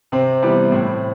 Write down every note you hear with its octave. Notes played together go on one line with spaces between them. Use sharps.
C3 C4
E3 G3 B3
A2 C4